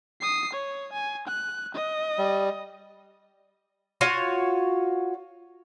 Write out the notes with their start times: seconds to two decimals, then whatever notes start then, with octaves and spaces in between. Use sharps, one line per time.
0.21 D#6 C7
0.53 C#5
0.93 G#5
1.28 F#6
1.75 D#5
2.18 G3
4.01 F4 F#4 C#5